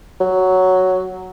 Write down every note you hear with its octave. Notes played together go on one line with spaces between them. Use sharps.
F#3